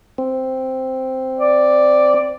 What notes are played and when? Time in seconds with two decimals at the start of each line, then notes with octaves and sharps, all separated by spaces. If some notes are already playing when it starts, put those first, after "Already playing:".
0.18 C4
1.38 D5